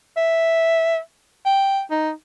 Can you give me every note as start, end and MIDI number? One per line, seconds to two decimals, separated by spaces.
0.17 0.98 76
1.46 1.81 79
1.91 2.11 63